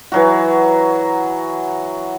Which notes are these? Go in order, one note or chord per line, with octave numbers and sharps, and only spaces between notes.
E3 F#3 F#4